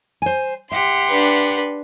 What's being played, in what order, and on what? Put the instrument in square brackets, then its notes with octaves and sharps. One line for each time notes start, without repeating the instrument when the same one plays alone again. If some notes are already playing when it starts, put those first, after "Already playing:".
[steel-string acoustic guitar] C5 G#5
[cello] G4 F#5 [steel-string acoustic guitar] E5 [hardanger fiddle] C6
[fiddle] D4 B4